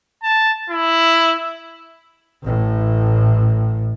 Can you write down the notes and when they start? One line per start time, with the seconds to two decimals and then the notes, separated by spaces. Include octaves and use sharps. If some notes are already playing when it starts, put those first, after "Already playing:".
0.23 A5
0.70 E4
2.43 A1 A2